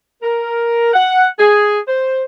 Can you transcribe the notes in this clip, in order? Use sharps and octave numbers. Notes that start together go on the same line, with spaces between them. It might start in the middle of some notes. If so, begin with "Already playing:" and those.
A#4
F#5
G#4
C5